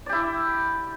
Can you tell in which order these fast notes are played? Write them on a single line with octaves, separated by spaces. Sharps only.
D5 G4 E4